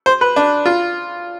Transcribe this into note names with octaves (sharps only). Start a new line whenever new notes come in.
C5
B4
D4
F4